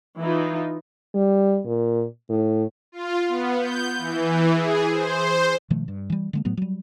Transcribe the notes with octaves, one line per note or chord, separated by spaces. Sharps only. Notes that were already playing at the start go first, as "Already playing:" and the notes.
E3 D#4 F4
G3
A#2
A2
F4
B3
G6
E3
G#4
C5
C5
B2 D#3 F3 A3
G2
E3 G3
D3 G#3 A#3
A2 F#3 A3 B3
F#3 G3